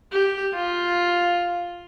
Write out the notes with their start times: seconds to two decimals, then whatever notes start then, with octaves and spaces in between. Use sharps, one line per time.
0.12 G4
0.54 F4